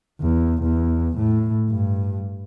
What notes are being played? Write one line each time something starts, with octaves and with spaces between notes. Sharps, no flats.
E2
E2
A2
G2